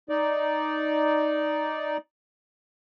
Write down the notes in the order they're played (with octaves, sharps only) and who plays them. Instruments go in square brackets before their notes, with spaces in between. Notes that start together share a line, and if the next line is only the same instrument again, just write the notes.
[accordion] D#4 D5